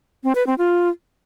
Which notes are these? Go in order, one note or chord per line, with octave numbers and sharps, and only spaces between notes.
C4
B4
C4
F4